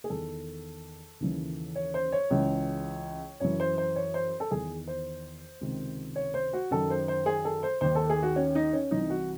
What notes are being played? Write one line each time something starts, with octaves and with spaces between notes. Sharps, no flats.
G#4
E2 D#3 A4
D#2 C#3 E3
C#5
C5
C#5
C#2 C#3 E3
F#2 E3 C#5
C5
C5
C#5
C5
A4
E2 D#3 G#4
C5
C#2 C3 D#3
C#5
C5
F#4
F#2 D#3 A4
C5
C5
G#4
A4
C5
D#2 D#3 C5
A4
G#4
F#4
C#4
D#4
C#4
C2 C3 E3 D#4
F#4